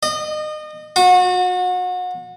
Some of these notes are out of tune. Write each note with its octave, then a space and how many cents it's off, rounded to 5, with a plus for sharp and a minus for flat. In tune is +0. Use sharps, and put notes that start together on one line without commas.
D#5 -30
F#4 -30